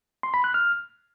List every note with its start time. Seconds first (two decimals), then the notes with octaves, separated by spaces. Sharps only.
0.23 C6
0.34 B5
0.44 F#6
0.54 F6